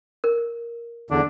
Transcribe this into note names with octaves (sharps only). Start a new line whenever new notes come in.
A#4
E2 D3 D4